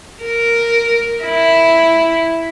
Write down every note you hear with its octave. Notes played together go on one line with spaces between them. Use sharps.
A#4
E4